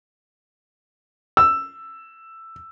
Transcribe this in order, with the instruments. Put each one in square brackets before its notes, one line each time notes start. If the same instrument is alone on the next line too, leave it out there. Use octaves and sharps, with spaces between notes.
[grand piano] E6